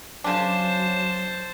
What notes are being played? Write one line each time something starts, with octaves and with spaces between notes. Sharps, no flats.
C#3 F#3 D4 C5 A5